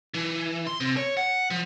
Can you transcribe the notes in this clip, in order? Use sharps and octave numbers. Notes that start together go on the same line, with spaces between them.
E3
C6
C3
C#5
F#5
F3